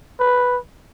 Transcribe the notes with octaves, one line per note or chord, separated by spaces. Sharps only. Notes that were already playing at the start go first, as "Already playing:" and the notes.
B4